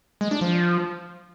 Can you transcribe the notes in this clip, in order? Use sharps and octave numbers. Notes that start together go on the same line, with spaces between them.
G#3
D4
F3